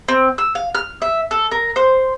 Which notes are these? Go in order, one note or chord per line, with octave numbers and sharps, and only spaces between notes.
C4
E6
F5
F6
E5
A4
A#4
C5